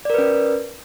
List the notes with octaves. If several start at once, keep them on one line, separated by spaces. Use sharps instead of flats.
C#4 A#4 B4 D5